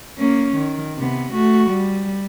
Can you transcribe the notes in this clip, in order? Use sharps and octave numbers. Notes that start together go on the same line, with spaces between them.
A#3 C#4
D#3
C3 B3
A3 F#4
G3